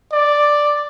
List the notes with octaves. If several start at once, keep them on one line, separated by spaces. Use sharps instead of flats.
D5